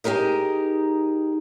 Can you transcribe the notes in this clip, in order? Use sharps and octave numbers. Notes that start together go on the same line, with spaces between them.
D#4 G4 G#4 A#4 D#5